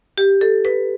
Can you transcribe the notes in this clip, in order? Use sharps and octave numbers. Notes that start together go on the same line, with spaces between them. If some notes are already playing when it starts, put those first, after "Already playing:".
G4
A4
B4